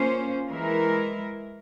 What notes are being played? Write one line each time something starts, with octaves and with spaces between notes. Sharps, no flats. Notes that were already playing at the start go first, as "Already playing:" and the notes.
Already playing: A#3 C#4 F4 C5
E3 G#3 E4 A#4